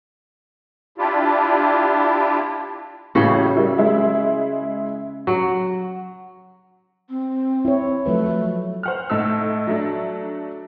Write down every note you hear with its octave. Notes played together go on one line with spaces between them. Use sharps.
D4 E4 F4 G4
A1 A2 C#3 F#4
G3 E4 A#4
G#3 E4 E5
F#3 F#4
C4
E4 C#5
F3 F#3 A3 B4
C5 F#5 F6
A2 D#4 A4 E6
F#3 A3 D4